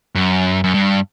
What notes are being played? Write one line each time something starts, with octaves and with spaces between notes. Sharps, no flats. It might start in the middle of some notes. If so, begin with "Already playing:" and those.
F#2
F#2
G2